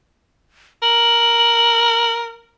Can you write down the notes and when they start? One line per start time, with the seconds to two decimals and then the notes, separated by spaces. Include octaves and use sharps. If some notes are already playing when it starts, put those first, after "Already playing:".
0.83 A#4 F#7